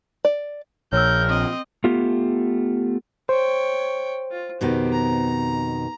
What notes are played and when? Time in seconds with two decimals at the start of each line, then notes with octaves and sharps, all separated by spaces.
0.25 D5
0.93 A#1 A#4 C#5 E6 G6
1.28 C4 D#5
1.84 A3 B3 F4 G4
3.29 C5 C#5 G5
4.31 F4
4.61 F2 B2 D#3 G4
4.93 A#5